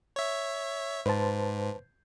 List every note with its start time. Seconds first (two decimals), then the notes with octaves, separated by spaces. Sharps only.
0.16 C#5 E5
1.06 G#2 B4 C5 A5